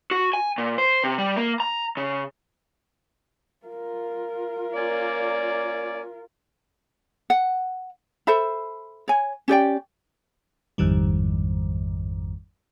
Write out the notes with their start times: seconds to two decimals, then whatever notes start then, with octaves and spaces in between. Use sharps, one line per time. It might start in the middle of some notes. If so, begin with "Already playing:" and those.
0.11 F#4
0.33 G#5
0.58 A#2
0.78 C5
1.04 C3
1.18 G3
1.36 A#3
1.60 A#5
1.97 C#3
3.66 F4 A#4
4.74 A#3 C#4 D5
7.30 F#5
8.27 A4 C5 E5 B5
9.08 C#5 G#5
9.48 C#4 G4 D5 G5
10.78 A1 F2 G#2 D#3 G3